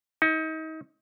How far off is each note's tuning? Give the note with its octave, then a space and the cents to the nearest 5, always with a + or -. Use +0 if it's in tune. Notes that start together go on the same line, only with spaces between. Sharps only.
D#4 +30